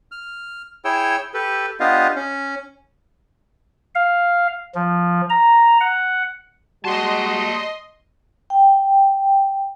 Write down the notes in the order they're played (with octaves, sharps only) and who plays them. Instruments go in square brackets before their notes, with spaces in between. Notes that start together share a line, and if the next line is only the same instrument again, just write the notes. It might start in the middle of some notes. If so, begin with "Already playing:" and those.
[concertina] F6
E4 G#4 C#5 G5 E6
G4 A4 B4
B3 D4 F4 G4 D#5 F5
C#4
[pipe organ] F5
F3
A#5
F#5
[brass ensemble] G3 G#3 [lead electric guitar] A#3 A5 [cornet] F#4 [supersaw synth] D#5 C6
[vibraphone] G5